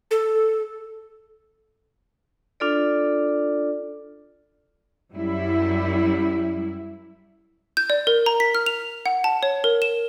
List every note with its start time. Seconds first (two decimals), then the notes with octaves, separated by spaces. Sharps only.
0.11 A4
2.60 D4 F4 A4 D5
5.12 F#2 G3 E4
7.77 G6
7.90 D5
8.07 A#4
8.26 A#5
8.40 B6
8.55 F6
8.66 F7
9.06 F#5
9.24 A5
9.43 C#5
9.64 A#4
9.82 E7